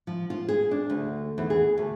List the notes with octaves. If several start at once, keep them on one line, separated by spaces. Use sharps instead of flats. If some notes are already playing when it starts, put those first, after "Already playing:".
F3
F4
G#4
D4
D2
E2
G#4
D2